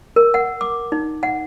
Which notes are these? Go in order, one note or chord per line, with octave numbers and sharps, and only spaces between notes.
A#4
F#5
D6
D#4
F#5